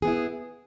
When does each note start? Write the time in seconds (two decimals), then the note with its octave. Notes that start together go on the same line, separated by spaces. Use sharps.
0.02 G#4
0.05 B3
0.08 E4